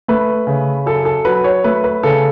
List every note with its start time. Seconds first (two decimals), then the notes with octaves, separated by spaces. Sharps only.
0.08 A3 B4
0.47 C#3
0.86 F#2 A4
1.05 A4
1.25 F#3 B4
1.44 C#5
1.64 A3 B4
1.84 B4
2.03 C#3 A4